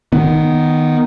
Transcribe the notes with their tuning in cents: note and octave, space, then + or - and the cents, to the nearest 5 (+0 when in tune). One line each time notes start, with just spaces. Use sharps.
D#3 +0 B3 +0